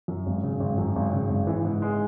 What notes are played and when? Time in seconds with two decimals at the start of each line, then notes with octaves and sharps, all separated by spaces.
0.08 F#2
0.26 G#1
0.43 C#3
0.60 G#1
0.78 F#2
0.96 G#1
1.13 C#3
1.29 G#1
1.47 E3
1.65 G#2
1.82 G#3